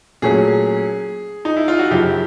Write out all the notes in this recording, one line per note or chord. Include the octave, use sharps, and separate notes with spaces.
A#2 F#3 A3 C#4 G#4
D#4
E4
F4
F#4
F#2 C#3 F3 G4